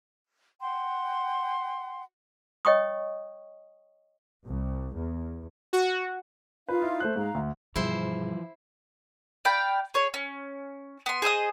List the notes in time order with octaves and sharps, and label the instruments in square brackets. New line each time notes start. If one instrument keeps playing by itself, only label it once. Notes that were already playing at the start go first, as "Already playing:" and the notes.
[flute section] F#5 G5 C6
[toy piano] C#5 D#5 G5 C#6 D#6
[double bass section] C2
E2
[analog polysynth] F#4
[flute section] D#4 F4 F5 [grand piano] B4
[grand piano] E4
A3 C5 F#6
[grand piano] G#2 G#3 [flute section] F5 A#5
[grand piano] D2
[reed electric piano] G2 B2 G#4 [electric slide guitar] E3 F3 [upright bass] G3 [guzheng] E4 C5
[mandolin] D5 F5 G5 B5
G#4 C#5
C#4
B3 C6
G#4 C5 D#5 D#6